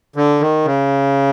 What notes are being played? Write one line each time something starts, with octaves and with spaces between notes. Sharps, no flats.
D3
D#3
C#3